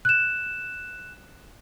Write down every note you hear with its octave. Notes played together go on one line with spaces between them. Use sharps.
F#6 E7